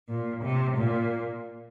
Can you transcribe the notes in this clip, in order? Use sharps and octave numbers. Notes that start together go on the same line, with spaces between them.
A#2
C3
A#2